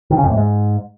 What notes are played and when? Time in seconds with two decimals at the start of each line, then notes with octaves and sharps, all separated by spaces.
0.10 D#3
0.17 C#3
0.23 F2
0.30 A2
0.36 G#2